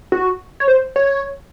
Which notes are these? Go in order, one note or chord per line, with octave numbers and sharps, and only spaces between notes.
F#4
C#5
C5
C#5